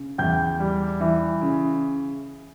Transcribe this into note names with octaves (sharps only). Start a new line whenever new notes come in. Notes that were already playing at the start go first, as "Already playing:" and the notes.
Already playing: C#3
E2 G5 G6
G3
E3
C#3